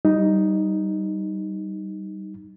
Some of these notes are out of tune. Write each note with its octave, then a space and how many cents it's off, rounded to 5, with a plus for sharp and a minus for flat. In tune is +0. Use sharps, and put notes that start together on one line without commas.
G3 -20 D#4 +0